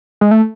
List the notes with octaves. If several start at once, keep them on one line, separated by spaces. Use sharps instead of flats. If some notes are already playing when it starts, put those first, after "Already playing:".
G#3
A3